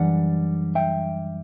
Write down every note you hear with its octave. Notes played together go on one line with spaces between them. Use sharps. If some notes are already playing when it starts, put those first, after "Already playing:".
Already playing: F#2 E3 G3 D4 D5 F#5
E5 G5